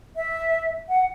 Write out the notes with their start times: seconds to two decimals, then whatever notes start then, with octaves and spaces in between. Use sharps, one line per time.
0.16 E5
0.89 F#5